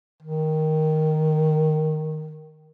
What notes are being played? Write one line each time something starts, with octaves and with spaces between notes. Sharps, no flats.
D#3